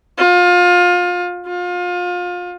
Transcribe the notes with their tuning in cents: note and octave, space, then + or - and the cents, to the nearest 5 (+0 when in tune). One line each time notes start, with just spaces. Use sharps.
F4 +25
F4 +30